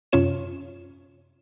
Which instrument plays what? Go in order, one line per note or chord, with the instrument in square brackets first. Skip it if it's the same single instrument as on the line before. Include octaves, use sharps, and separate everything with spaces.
[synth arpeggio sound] F#2 C3 C#4 F4 C#5 E7